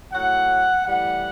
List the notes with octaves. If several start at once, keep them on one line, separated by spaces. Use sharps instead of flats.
A2 F#3 F#5
A2 E3 G3 F#5